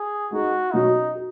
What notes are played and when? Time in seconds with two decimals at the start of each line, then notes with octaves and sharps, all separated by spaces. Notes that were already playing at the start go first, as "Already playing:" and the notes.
Already playing: G#4
0.31 G#3 D#4 F#4 G#4
0.73 B2 F#3 C#4 D#4 F#4
1.15 F#4